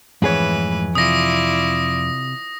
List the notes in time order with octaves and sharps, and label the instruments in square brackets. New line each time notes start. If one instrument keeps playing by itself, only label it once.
[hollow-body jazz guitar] F2 G#4 C#5 [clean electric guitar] G#2 A3 F#5 [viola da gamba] E3 B4
[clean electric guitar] C3 [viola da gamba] E4 F4 D5 [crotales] D#6 A#6